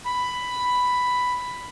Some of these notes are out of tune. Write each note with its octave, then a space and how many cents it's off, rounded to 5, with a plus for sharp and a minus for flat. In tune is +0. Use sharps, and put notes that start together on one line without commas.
B5 +5